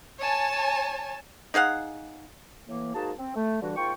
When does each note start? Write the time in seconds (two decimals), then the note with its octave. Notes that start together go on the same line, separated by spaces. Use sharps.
0.22 C#5 G#5 A5
1.54 D#4 G#4 F5 F#5
2.67 A2 E3 A#3
2.94 G#2 A#3 D#4 F#4 G#4 A5
3.18 C4
3.36 A3
3.62 G2 D3 E3 G3 D4 F#4
3.76 G#2 A#3 F4 G5 C#6